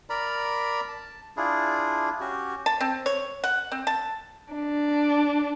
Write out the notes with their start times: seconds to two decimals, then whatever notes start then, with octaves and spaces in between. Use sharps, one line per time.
0.10 A#4 D5 A#5 B5
0.88 A5
1.37 D4 E4 F4 G#4
2.20 C#4 F#4 G4
2.66 A5
2.81 C4
3.06 C#5
3.44 F#5
3.72 C4
3.87 A5
4.54 D4